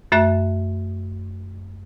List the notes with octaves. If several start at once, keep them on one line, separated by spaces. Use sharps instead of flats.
F#2 A3 E5 F#6